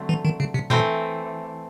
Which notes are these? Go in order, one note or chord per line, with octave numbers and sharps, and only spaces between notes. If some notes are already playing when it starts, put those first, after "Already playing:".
Already playing: D3 F#3 A3 C4
E3
D#3
C#3
C3
B2 E3 A3 C4